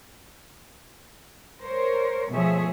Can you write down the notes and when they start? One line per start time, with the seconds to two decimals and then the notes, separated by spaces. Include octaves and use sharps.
1.63 A#4 C5 C#5
2.31 B2 F3 A3 G#4 C#5 E5